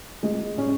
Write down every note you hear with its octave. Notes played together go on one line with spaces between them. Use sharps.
G#3 G#4
C#4